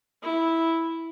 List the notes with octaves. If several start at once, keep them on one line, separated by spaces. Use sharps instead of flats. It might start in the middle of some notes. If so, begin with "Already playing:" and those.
E4